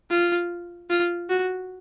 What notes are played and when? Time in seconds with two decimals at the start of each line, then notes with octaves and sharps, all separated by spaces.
0.10 F4
0.90 F4
1.30 F#4